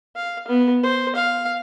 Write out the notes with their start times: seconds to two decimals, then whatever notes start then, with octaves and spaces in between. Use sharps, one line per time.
0.16 F5
0.48 B3
0.83 C5
1.15 F5